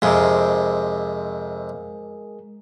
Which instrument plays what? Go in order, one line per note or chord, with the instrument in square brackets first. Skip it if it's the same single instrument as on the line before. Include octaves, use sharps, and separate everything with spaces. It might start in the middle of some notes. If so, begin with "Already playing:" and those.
[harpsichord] F2 C3 [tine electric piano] G#3 G#4 A#4